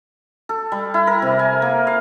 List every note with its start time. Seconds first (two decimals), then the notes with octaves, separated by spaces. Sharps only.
0.49 A4
0.72 G3
0.94 E4
1.07 A#4
1.22 C3
1.39 G#5
1.62 A#3
1.87 F5